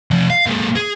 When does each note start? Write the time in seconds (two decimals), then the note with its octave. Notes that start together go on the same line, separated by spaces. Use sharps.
0.11 F3 A3
0.30 F5
0.46 A#2 G#3
0.76 G#4